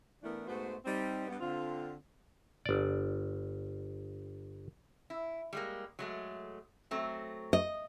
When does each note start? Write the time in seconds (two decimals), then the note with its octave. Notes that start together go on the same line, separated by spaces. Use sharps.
0.23 E3 A3 B3 D4 E4 A#4
0.47 G#2 A3 B3 F#4 C5
0.86 G3 C4 D#4
1.27 G2 B3
1.40 D3 C4 F4
2.66 G1 D5
5.10 E4
5.53 G3 G#3 A#3
5.99 F#3 G#3 A3
6.91 F#3 A3 C4
7.53 D#5